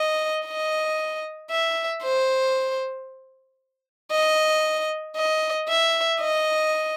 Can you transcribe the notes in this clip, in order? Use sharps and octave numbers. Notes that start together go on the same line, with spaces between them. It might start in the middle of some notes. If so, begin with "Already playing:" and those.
Already playing: D#5
D#5
E5
C5
D#5
D#5
E5
D#5